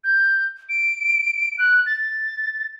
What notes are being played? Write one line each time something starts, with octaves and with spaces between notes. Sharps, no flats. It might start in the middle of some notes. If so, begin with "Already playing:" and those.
G6
D7
F#6
A6